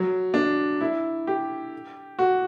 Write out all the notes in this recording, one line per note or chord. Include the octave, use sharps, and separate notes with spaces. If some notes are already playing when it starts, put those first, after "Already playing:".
Already playing: F#3
D4
E4
G4
F#4